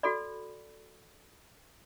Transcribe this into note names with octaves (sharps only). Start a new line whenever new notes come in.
F#4 A4 D5 B5